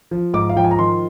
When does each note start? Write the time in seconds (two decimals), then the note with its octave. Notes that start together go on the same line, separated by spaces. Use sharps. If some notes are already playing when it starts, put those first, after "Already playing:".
0.11 F3
0.34 G#2 D6
0.49 F5
0.56 F3 G5
0.65 G#5
0.71 A#5
0.78 D#3 C6